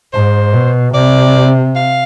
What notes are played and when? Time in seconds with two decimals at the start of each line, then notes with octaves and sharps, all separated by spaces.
0.13 G#2 C5
0.54 B2
0.94 C3 D5
1.76 F5